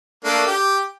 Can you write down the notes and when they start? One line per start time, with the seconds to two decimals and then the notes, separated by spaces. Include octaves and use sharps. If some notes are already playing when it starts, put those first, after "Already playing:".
0.25 A3 A#3 D4
0.47 G4